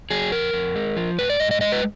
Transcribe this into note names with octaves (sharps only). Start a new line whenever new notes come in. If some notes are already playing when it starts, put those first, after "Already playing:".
F#3 G#4
F2 A#4
F2
G#3
F3
G#2 B4
D5
G#2 D#5
D#5
G#3 D#5
B4